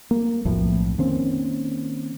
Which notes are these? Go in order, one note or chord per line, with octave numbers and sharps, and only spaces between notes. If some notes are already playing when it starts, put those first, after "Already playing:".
A#3
B1 F2 A2 F3
D#3 A#3 C4 C#4